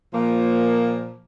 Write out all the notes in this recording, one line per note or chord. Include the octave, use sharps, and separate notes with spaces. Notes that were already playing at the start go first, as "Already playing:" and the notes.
A#2 F3 A#3